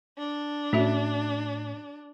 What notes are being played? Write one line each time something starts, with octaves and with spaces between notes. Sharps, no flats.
D4
A2 C#4 F#4 E5